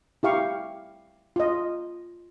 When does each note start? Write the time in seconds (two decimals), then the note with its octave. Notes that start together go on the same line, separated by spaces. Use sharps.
0.23 E4 G4 F5 C#6
1.36 F4 D#5